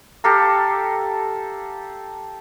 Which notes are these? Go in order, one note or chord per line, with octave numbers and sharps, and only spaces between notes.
G4 A4 F5 A#5